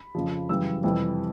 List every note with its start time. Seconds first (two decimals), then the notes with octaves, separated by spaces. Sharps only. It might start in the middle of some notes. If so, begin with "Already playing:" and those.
Already playing: B5
0.15 F2 C#3 F3
0.49 F#2 C#3 E3 G3 E6
0.84 F2 C3 E3 G3